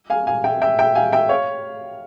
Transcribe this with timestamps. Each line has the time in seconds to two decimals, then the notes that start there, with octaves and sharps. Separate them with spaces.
0.10 F5 G#5
0.27 F5 G#5
0.44 E5 G5
0.62 E5 G5
0.79 E5 G5
0.95 F5 G#5
1.13 E5 G5
1.29 C#5 F5